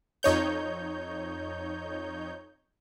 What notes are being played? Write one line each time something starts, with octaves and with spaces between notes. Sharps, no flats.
F2 D#4 C#5 G6